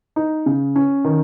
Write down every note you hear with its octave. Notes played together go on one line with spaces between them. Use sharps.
D#4
C#3
C#4
D#3